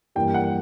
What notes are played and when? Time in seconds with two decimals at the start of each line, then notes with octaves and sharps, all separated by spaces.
0.15 G2 E3 G3 A#3 G5
0.34 F#5